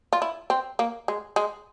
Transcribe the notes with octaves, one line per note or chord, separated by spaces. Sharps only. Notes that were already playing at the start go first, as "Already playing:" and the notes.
F4
E4
C4
A#3
G#3
G#3